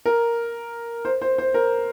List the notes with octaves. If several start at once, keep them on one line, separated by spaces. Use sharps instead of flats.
A#4
C5
C5
C5
A#4